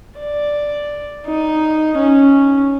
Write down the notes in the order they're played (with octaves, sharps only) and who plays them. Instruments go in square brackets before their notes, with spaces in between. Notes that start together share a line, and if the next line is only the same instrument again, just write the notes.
[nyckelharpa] D5
D#4
C#4